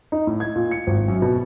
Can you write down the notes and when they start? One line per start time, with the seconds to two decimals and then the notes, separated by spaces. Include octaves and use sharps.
0.12 D#4
0.27 A2
0.40 G#6
0.56 A#2
0.71 C#7
0.87 G#1
1.08 F#2
1.22 B2